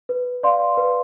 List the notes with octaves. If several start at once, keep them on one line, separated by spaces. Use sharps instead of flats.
B4
D5 F5 C6
B4